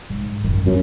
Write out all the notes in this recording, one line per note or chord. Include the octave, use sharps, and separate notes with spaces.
G#2
F#2 D#3
F#2 F#3 C4